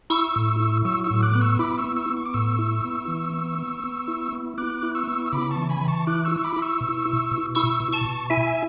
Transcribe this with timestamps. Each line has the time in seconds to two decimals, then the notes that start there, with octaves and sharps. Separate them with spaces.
0.10 E4 C#6 E6
0.36 A2
0.60 E4
0.85 F#3 C#6 E6
1.04 C#6 E6
1.10 A2
1.23 D6 F#6
1.33 B3 F#6
1.41 C#6 E6
1.59 E4 B5 D6
1.78 C#6 E6
1.84 B3
1.96 C#6 E6
2.10 B3
2.16 C#6
2.26 D6
2.34 A2 C#6 E6
2.59 E4
2.84 B3
3.08 E3
3.33 B3
3.59 B3
3.84 B3
4.08 E4
4.33 B3
4.58 B3 D6 F#6
4.83 E4
4.95 C#6 E6
5.07 B3
5.26 E6
5.32 C#3 B5 D6
5.51 A5 C#6
5.56 E3
5.69 G#5 B5
5.81 E3
5.88 A5 C#6
6.07 E4 D6 F#6
6.25 C#6 E6
6.32 E4
6.38 C#6
6.43 B5 D6
6.56 E4
6.62 C#6 E6
6.81 B2
7.05 E4
7.31 B2
7.55 E4 C#6 E6
7.80 B2
7.93 A5 C#6
8.05 B2
8.30 E4 E5 G#5